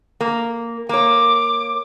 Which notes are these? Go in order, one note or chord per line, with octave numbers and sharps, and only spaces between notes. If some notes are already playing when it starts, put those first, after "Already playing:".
A#3
A#3 C#5 D6